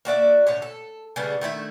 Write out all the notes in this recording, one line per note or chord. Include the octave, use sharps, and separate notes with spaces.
A#3 F#4 D5 E5
A2 D3 C#5
A4
C#3 G3 A3 B3
D#3 A3 E4 E5